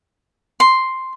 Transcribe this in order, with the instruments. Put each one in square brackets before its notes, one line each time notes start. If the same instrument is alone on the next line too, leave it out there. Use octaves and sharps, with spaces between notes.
[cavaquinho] C6